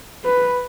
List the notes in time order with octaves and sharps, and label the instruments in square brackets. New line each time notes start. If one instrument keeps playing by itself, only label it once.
[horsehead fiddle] B4